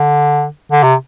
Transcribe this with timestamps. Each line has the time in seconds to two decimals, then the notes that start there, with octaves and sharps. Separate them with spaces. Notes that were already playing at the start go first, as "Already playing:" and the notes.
Already playing: D3
0.72 D3
0.83 C3